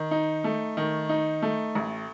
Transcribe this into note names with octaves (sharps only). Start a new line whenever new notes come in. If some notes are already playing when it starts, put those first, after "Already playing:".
Already playing: D#3
D#4
A3
D#3
D#4
A3
A1